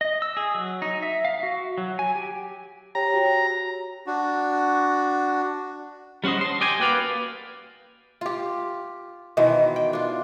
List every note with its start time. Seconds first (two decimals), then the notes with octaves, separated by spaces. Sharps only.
0.01 D#5
0.22 E6
0.37 G#4
0.55 F#3
0.82 D#4
1.02 E5
1.25 F5
1.43 F#4
1.78 F#3
1.99 G#5
2.15 G4
2.95 G4 C#5 G5 A#5
3.14 F#4
4.07 D4 F#4
6.24 G3 C#4 F#4 C5 D#5
6.41 D3 C6
6.61 G4 D5 D#5 G5 G#5
6.79 A#3 F#4 B4 D5 F5
8.21 F4 G4
9.37 B2 D#3 E3 C5
9.76 G5
9.93 D4 F4